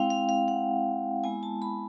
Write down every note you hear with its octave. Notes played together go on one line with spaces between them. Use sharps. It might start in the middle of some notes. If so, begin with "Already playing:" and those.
Already playing: G#3 C4 E4 F5 G5
F5
F5
F#5
G#3 B3 E4 G#5
A5
B5